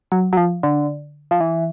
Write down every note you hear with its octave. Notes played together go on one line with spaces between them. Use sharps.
F#3
F#3
F3
D3
F3
E3